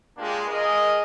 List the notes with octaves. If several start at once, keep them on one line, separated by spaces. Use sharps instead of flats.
G#3 A#3 D4 F4 G4
G#4 A#4 D#5